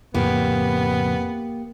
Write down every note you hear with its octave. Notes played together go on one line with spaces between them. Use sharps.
F2 A2 C#3 A#3 B3 G4